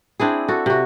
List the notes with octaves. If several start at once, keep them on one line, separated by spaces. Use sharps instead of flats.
C4 D4 E4 G#4
F#4 A4
C3 F#4